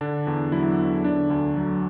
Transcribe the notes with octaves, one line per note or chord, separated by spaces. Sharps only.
D3 D4
E2
F#3 E4
E2
D3 D4
D2
F#3